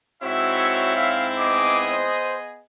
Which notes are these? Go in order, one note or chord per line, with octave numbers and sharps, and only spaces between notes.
G#2 C4 E4 F#4 C#5 E5
F5
B3 G#4 D#5 D6
C5